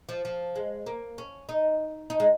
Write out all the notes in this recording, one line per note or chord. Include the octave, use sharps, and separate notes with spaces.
F3
F3
G#3
A#3
C#4
D#4
D#4
G#3